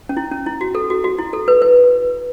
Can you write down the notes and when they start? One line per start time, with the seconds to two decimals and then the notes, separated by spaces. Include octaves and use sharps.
0.09 C#4
0.17 E4
0.32 C#4
0.46 E4
0.61 F#4
0.75 A4
0.90 F#4
1.04 F#4
1.19 E4
1.33 A4
1.48 B4
1.62 B4